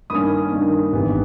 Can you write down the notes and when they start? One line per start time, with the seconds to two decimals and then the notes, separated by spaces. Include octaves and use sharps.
0.10 G2 D#3 A#3 C#4 B5 D#6
0.51 G2 D#3 A#3 C#4
0.93 G#1 G2 E3 G3 B3